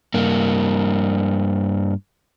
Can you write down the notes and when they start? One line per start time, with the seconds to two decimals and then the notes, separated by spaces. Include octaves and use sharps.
0.14 G2 A#3